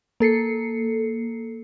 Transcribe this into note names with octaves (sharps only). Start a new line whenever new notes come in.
A#3 A4 C7 C#7